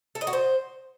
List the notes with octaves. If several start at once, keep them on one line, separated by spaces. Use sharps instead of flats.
A4
D#5
F#4
C5